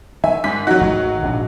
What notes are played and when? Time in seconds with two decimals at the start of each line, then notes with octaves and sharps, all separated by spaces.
0.24 D#3 E5 G#5
0.44 G#2 B6
0.67 F#3 D#4 F#4
0.81 G#1 D#3 A3
1.22 A#1 G#2 D4